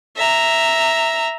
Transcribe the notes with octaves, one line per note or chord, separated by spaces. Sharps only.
E5 A#5